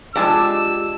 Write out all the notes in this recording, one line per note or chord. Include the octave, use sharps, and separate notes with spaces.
G#3 D4 F4 G4 G5 A5 E6